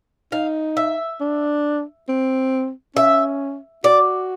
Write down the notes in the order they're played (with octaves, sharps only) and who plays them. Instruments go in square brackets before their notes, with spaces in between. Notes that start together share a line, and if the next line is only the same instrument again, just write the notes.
[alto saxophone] D#4 [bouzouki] F5
[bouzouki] E5
[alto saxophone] D4
C4
[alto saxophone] C#4 [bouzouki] E5
[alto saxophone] F#4 [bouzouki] D5